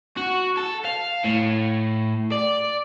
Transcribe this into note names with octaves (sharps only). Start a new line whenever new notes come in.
F#4
A4
F5
A2
D5